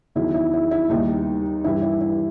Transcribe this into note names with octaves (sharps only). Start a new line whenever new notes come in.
E2 D#3 F#3 E4
E4
E4
E4
D#2 D#3 G3 D#4
G2 E3 G3 E4
E4
E4